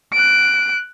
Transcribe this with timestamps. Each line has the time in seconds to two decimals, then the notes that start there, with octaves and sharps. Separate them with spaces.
0.13 F#6 D7